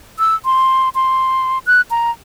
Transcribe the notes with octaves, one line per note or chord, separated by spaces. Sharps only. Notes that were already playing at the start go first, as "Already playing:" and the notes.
E6
C6
C6
F#6
A#5